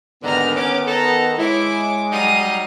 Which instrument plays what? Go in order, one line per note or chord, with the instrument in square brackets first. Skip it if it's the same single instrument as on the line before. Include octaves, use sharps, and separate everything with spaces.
[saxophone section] D#2 G#2 D3 [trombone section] D#3 B3 [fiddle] A#5 F6
[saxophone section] C#4 [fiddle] D6
[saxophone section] A4 [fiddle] A#5
[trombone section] G#3 [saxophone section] E4 [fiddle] C#5 D6
[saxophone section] F#3 G3 D#4 [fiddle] F5 D#6